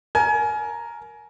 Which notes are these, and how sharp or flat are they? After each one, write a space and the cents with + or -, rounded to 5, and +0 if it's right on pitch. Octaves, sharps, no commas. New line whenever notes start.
A#4 +0 G#5 +30